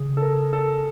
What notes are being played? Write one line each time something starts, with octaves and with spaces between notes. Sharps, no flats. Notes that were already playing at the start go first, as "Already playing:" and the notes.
Already playing: C#3 G#4
A4
A#4
A4